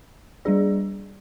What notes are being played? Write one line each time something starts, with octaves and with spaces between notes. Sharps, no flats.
G3 D4 G#4 D5